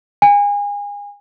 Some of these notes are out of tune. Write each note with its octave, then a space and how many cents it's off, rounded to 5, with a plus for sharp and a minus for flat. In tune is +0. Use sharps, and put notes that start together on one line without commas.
G#5 -30